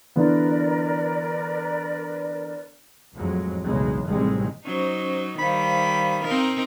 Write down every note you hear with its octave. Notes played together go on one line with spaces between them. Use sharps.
D3 E3 B3 A#4 B4 D5
F2 A2 F#3 G#3
B1 E2 A2 C#3 G#3
A1 A2 C3 D#3 G3 G#3
F#3 C#4 D#4 C5
D#3 G3 C5 F5 B5
C4 D#4 A#4